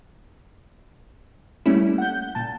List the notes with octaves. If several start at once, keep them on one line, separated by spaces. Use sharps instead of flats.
G3 A3 A#3 C#4 E4
F#5 G6
A#2 A5